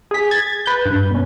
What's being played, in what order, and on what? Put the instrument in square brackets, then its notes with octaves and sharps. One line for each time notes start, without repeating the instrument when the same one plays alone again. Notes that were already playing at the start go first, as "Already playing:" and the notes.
[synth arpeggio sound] G#4 B6
G#6 A6
B4 G6
G2
B2 C#4